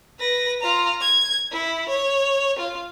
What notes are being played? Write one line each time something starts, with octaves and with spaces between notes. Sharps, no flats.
B4 A#6
F4 A#5
G#6
E4
C#5
F4